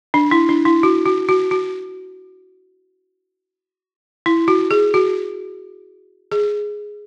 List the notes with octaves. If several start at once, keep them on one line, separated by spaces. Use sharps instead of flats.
D4
E4
D4
E4
F#4
F#4
F#4
F#4
E4
F#4
G#4
F#4
G#4